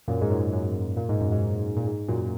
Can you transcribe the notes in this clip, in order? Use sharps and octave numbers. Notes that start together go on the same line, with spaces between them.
F#2 A#2
G#2
F#2 A#2
F#2
A#2
G#2
F#2
G#2
A#2
G#2
F#2 A#2